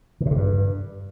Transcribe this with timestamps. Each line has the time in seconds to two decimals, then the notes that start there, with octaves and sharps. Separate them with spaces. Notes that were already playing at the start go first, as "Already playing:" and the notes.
0.21 D#3
0.26 C3
0.31 D3
0.36 G2